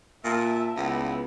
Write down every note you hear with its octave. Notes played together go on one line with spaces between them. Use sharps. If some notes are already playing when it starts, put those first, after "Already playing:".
A#2 E5 A5
C#2 B3 E4